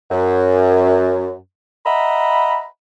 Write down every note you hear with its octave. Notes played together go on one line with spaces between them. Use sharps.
F#2
D#5 E5 F#5 A#5 B5